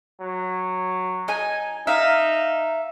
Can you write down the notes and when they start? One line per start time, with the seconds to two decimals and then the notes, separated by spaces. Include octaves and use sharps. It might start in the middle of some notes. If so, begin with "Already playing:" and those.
0.20 F#3
1.28 D#4 G#5
1.87 D#4 E5 F5